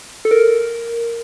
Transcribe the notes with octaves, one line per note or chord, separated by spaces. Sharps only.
A4
A#4